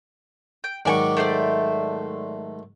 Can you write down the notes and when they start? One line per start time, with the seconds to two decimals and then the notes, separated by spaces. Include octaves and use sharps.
0.64 G5
0.85 G#2 D#3 F#3 D5 G#5 C#6
1.17 A3 C5 D5